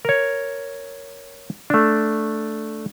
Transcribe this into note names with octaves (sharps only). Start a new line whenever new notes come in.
A#4 C#5
A3 D4